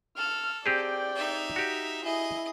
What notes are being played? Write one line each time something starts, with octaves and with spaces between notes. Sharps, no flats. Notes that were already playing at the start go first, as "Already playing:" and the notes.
A4 F6
C4 G4 G#4 D5 G5
D#4 E5
F#4 G4
E4 G#4 D#5